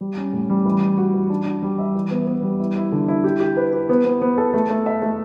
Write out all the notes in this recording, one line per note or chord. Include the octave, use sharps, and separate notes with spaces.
G3
C#4
A2
G3
E3
E3
F#4
E3
D4
D4
G3
E5
E3
B3
B3
G3
E4
E4
D3
E4
G4
G4
B4
G4
B3
B3
B3
A4
A3
A3
E5
A3